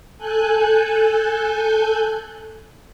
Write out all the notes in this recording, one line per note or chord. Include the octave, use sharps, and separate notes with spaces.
A4 G#5 F#6 G6